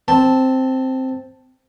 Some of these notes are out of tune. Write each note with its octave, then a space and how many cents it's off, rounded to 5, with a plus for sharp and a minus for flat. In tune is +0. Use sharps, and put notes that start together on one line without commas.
C4 +0 A5 +0